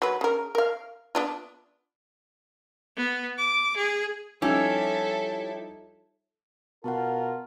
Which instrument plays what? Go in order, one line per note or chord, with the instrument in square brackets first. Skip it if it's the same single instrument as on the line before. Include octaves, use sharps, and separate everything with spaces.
[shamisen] F#3 B4
C#3 A#4
A#4 F5
B3 D4 F4
[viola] B3
D6
G#4
[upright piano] F3 G3 D#4 [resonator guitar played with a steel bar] C#4 [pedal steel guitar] E4 G4 [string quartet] A4 E5
[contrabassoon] B2 [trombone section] F4 A#4 [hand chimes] F#5 A5